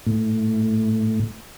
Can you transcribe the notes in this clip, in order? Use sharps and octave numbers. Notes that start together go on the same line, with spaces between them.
A2